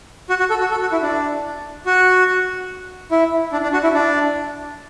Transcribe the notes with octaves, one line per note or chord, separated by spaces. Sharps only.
F#4
F#4
A4
F#4
A4
F#4
E4
D4
F#4
E4
D4
D4
F#4
E4
D4